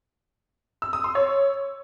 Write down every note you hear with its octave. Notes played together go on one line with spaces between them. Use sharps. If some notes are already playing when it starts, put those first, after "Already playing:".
E6
D#6
C6
C#5